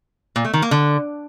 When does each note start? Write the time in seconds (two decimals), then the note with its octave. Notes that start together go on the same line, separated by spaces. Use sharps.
0.36 A#2
0.45 A3
0.53 D#3
0.62 A#3
0.71 D3